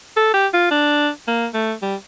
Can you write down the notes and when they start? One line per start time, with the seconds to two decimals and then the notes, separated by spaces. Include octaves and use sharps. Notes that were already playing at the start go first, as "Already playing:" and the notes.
0.17 A4
0.34 G4
0.54 F4
0.71 D4
1.28 A#3
1.54 A3
1.82 G3